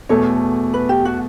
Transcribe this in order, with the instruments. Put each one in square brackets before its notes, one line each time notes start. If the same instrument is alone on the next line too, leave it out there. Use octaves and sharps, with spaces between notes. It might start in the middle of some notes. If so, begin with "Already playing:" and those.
[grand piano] E2 B2 A3 [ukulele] A4 C#5
[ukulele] B4
G4
F#4